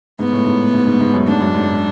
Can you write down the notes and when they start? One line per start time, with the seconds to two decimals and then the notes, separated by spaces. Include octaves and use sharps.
0.19 G#2 B3
0.32 A2
0.45 G#2
0.74 G#2
0.87 G#2
1.01 G#2
1.14 F#2
1.28 G#2 D4
1.41 F#2
1.55 G#2